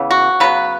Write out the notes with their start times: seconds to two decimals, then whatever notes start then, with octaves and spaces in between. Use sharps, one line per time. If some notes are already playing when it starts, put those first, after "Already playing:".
Already playing: C#3 E3 B3
0.11 F#4
0.40 C#3 F#3 B3 B4